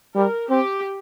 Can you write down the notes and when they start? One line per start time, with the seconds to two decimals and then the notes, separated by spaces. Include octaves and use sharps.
0.15 G3 A#4
0.50 C4 G4